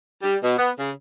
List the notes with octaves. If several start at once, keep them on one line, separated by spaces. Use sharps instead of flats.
G3
B2
B3
C#3